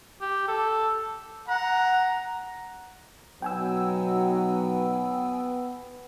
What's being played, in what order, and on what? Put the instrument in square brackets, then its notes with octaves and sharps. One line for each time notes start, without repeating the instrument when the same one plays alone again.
[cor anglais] G4
A4
[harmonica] F#5 [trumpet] A#5
[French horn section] B2 F#3 D#4 [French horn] B3 [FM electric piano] G5 G#5 E6